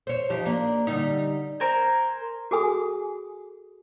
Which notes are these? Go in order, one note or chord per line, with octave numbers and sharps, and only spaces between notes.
C5 C#5
F3 D#4 G4
A#3 D4
D3 G3 D#4
A#4 C5 G#5
F#4 G#4 A4 G#5 D#6